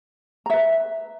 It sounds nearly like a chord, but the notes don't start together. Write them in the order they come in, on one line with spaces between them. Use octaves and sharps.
A#5 E5 B4